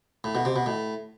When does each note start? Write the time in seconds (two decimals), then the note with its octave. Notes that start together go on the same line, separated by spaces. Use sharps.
0.24 A2
0.35 B2
0.45 C3
0.56 B2
0.66 A2